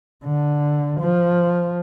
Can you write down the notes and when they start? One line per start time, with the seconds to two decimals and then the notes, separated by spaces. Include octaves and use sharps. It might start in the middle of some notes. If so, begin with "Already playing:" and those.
0.25 D3
1.01 F3